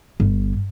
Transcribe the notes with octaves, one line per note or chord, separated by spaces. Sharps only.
G1